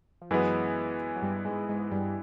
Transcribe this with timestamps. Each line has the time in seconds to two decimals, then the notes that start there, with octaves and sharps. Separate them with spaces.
0.21 F3
0.30 F#2 E3 F#3 G#3 B3
1.16 F#3
1.22 G2 G3
1.45 G#2 G#3
1.68 G#2 G#3
1.91 G2 G3